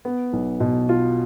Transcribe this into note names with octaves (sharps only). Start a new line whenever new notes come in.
B3
B1
B2
F4